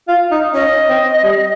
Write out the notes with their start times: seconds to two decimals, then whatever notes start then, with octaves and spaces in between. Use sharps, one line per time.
0.08 F4
0.31 D#4
0.54 C#4 D#5
0.89 C4
1.24 G3